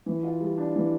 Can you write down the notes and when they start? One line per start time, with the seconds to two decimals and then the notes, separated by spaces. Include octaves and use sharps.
0.06 E3
0.23 F4
0.41 G3
0.58 D4
0.76 E3